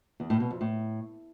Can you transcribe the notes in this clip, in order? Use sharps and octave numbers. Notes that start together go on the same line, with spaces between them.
E2
A2
B2
F2
A2